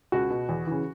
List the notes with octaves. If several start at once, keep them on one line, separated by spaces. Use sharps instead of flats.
C#2 F#4
B2
E2
C#3 E3